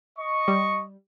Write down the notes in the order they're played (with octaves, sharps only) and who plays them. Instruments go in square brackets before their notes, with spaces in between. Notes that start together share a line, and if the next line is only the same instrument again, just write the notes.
[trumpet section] D#5 C#6
[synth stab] G3